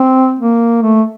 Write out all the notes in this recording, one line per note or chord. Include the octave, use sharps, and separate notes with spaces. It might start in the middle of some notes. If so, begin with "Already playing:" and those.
Already playing: C4
A#3
A3